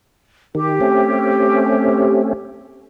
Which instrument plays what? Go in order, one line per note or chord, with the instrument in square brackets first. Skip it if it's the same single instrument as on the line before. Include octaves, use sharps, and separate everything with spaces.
[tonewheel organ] D#3 [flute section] G4
[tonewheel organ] A3 C4 C#4